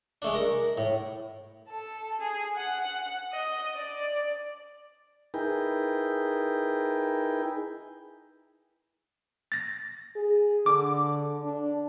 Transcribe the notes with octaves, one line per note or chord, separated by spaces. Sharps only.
G#3 A3 D4
A#4
A2
A4
G#4
F#5
D#5
D5
D#4 E4 G#4 A#4 B4 G5
A6 A#6
G#4
D3 D6
D4